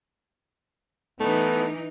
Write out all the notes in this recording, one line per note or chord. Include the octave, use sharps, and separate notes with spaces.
E3 A3 B3 D#4